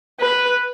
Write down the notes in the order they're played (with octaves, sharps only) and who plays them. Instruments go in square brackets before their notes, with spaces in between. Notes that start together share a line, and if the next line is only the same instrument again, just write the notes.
[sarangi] B4